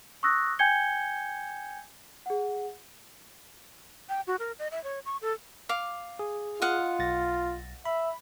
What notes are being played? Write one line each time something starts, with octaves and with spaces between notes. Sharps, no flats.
C#6 D#6 E6 F#6 A#6
G5 G#5 G6 G#6 C#7 G7
G#4 F#5
G5
F#4
A#4
D#5
E5
C#5
C#6
A4
F5 D6
G#4
F4 D#5 F5 F#5
B1 A6 A#6
E5 B5